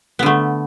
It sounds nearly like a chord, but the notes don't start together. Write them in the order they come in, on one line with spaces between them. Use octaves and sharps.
B3 D3 A3